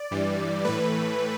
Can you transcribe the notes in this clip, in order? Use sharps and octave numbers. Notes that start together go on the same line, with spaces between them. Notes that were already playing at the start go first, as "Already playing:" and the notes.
Already playing: D5
G2 E3 G3
A2 E3 A3 B4